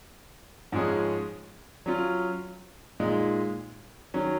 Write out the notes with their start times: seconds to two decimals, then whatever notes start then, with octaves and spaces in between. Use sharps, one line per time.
0.72 G#2 F3 G#3 C#4 G#4
1.86 F#3 C#4 F4
3.00 A#2 G#3 D#4
4.14 D#3 F#3 C#4